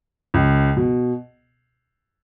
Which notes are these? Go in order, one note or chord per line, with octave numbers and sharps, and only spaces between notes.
C#2
B2